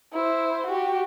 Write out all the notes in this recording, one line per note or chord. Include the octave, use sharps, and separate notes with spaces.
E4 C5
F#4 G4